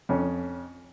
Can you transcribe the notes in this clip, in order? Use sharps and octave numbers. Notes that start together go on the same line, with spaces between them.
F2 C#4